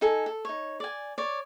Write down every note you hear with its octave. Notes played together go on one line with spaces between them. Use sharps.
D#4 A4 G#5
A4
D#4 C#5
D5 G#5
C#5 D5